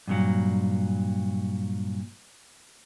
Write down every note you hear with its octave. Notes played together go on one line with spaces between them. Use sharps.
G2 A#2 F#3